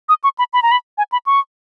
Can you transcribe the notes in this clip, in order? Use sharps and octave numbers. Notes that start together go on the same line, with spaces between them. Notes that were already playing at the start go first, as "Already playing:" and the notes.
D#6
C#6
B5
B5
A#5
B5
G#5
B5
C#6